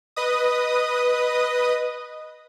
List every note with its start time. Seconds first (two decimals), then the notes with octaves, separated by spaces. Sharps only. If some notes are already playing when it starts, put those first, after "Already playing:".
0.16 B4 D#5 D#6